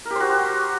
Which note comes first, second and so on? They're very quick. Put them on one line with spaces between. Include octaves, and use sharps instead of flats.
A#4 G4 C5 F#4